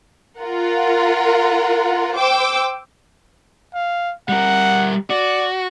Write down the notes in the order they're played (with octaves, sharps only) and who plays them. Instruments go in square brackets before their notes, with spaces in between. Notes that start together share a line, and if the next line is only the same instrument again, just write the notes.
[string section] F4 A#4 F#5
C5 G5 D6 E6
[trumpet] F5
[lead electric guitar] G3 A#4 [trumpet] F#5
[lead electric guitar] F#4 [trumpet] D5